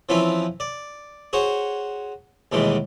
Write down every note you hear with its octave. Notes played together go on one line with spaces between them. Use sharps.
E3 F3 C4 C#4 E4 F4
D5
F#4 G#4 C5 C#5
D#2 B2 E3 G3 G#3